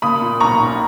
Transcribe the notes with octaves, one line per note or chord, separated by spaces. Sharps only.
A#3 B5 D#6
A#2
B1 A#5 C#6
B1